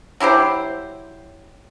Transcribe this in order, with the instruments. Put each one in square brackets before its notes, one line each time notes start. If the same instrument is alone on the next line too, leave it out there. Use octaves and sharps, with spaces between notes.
[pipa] F#3 E4 G4 C5